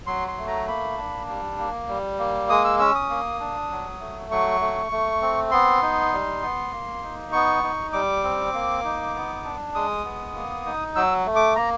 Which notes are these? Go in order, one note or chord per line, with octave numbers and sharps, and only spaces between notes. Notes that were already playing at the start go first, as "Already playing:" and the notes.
F#3 C6
C6
A3
A#5
A#3 B5
D4
G3
A#3
G3
A#3
G#3 D#6
E6
C#4 E6
D#6
A#3
D4
F#3
A3
F#3 C#6
A3
A3
C4
B3 C6
D#4
G3
B3
A#3
D#4
B3 C#6
D#4
G3 D6
C4
A#3
D#4
B3
D4
G#3 D#6
B3
A#3
D#4
F#3 E6
A3
D6
A#3 A#5